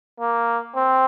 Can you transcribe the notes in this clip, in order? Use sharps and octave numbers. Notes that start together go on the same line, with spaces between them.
A#3
C4